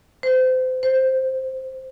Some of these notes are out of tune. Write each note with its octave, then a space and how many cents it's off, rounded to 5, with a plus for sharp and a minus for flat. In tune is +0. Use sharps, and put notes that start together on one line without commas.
C5 -30
C5 +5